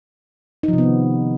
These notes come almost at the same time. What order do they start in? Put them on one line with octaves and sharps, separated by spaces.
D#4 F3 C3 B3 D#3